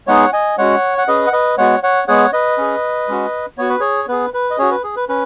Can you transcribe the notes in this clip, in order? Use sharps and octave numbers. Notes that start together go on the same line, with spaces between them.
G#3 B3 D#4 G#4 C#5 F#5
D#5 G#5
G#3 C#4 F#4 C#5 F#5
F#5
C#4 G#4 B4 D#5
F#5
B4 D#5
G#3 B3 F#4 C#5 F#5
C#5 F#5
G#3 B3 G#4 C#5 F#5
B4 D#5
C#4 G#4
G#3 C#4 F#4
B3 F#4 C#5
B4
G#4 C#5
B3 G#4 B4
B4
D#5
C#4 F#4 G#4 C#5
B4
G#4
B4
C#4 B4